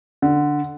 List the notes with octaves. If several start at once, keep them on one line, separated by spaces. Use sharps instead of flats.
D3